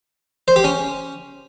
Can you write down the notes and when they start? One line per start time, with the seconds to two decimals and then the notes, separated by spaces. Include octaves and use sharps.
0.48 C5
0.56 G4
0.64 C#4